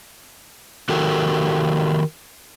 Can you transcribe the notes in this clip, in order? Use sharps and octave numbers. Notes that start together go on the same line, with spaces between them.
D#3 F#4 G4 A4 A#4